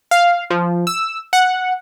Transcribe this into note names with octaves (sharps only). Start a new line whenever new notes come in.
F5
F3
E6
F#5